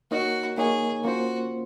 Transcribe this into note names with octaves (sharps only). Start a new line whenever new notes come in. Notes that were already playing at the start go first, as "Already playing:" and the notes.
A#3 D#4 F#4 A#4 C#5
A#3 D#4 G#4 A#4 C#5
A#3 C#4 F4 F#4 C5